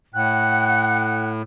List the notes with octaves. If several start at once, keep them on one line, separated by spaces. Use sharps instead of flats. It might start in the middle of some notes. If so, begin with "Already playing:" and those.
A2 F#5 G5 F#6